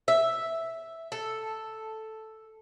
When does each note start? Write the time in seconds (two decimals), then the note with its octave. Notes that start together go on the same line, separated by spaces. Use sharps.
0.08 E5
1.12 A4